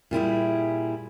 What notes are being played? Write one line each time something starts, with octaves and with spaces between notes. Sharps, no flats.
A#2 G3 E4 G#4